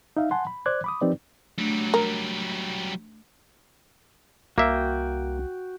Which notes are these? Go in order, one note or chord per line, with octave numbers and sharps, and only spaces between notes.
D#4 E5 F5
F#5 G#5 A5 C6
B5
C5 D5 D6 F#6 G#6
B5 D6 D#6
F3 C4 D#4 G4 B4 D5
F#3 G3 A3 D4
A#4
C2 A#3 F#4 E5 G5